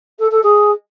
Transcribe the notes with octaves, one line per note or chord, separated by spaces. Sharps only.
A4
A4
G#4